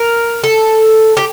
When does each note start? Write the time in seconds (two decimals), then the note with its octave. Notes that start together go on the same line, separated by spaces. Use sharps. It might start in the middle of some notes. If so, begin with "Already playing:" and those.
Already playing: A#4
0.44 A4
1.17 G4